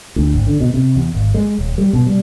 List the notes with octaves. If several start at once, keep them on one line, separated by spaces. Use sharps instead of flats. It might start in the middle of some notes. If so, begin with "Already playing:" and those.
D2
G#1
D3
B2
C3
E2
G#1
G#3
D#1
G3
B2
G3